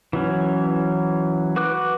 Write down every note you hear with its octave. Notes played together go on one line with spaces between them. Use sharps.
E3 F#3 C#4
F#4 B4 D6 F#6